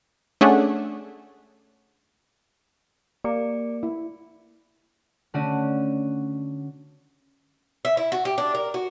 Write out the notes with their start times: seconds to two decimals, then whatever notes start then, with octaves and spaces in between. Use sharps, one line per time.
0.41 A3 C#4 D4 G#4 C#5 F#5
3.24 A#3 G4 D5 D6 C#7
3.83 E4
5.34 D3 A3 C#4 F#4 D5 D#7
7.85 E5
7.97 E4
8.12 F#4
8.25 G4
8.38 D4
8.55 A#4
8.74 F#4